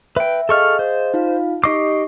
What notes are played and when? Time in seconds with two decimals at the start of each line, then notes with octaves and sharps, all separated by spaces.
0.16 B4 E5 G5
0.49 G#4 A4 D#5 F5 C#6 F6
0.79 C5
1.14 D#4 F4 F5
1.64 D#4 G4 D#5 C#6 D6 C7